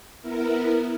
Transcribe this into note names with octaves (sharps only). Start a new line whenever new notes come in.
B3 E4 A#4